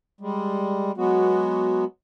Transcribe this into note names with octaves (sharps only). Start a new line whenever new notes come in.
G3 G#3
F#3 G#3 B3 F#4